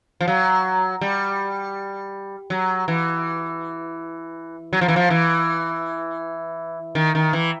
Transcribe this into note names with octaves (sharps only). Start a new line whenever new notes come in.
F3
F#3
G3
F#3
E3
F#3
F3
E3
F3
E3
D#3
D#3
E3